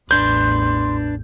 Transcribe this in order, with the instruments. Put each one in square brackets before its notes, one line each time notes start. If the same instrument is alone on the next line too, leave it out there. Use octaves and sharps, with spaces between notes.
[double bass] A1 E2 [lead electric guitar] D4 B4 [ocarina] C6 [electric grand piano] G6